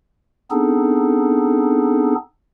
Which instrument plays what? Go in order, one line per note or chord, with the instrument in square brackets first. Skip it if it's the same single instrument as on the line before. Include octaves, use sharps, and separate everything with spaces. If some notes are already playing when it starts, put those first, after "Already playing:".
[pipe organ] B3 C4 D4 D#4 G#4 A4